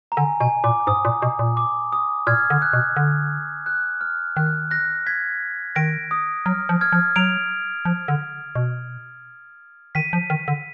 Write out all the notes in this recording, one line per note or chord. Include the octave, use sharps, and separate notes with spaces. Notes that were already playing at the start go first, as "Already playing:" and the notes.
A#5
D3 G#5
B2 G#5
A#2 D6
G#2 D#6
A#2
B2
A#2
D6
D#6
A#2 F6 G#6
D3
F#6
B2
D3
F#6
F6
D#3 F#6
F#6 A#6
G#6 B6
D#3 A#6 D7
D#6
F#3 F6
F3
F6 G#6
F3
F#3 D7 F7
F3
D3
B2
D#3 B6 D#7
F3
D#3
D3